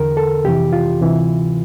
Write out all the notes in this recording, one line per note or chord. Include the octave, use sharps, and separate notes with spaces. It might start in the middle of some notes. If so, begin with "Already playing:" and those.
Already playing: E2 D3 A#4
A4
F2 C3 E3 G4
F4
D2 C3 E3